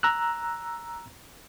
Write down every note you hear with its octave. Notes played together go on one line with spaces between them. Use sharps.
A#5 E6 F#6